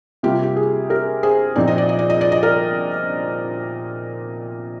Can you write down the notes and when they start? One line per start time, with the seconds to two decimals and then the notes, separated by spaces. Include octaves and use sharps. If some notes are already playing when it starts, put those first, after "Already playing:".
0.23 C3 G3 A#3 F4 G4
0.43 G4
0.56 G#4
0.90 G4 A#4
1.23 G#4 C5
1.56 A#2 F3 C4 D#4 D5
1.68 D#5
1.78 D5
1.89 D#5
1.99 D5
2.10 D#5
2.21 D5
2.32 D#5
2.43 A#4 D5